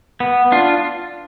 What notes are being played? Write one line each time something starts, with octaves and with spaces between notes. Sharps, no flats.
B3
D4 F4